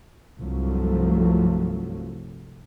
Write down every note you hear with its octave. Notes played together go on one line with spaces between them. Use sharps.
C2 G2 F3 F#3 A3